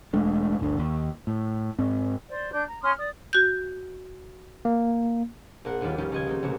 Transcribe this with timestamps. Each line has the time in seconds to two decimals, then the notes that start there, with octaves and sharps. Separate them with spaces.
0.13 E1 G#3 A3 D4
0.59 G1 D2 D3
0.78 D#2
1.27 A2
1.79 G#2 C4
2.28 C5 D5
2.52 D4 G6
2.67 A#5
2.82 C#4 C6 D#6 F6
2.97 D5 D#6
3.33 F#4 G6
4.65 A#3
5.65 A#1 A#3 A#4 F#5
5.81 A1 D#2 G3 D#4 F4
5.98 F3 G3 C#4 D#4 F4
6.12 C#2 D#5 G#6
6.26 F#3 A#3 C4 D#4
6.43 A1 C3 A#3 F#4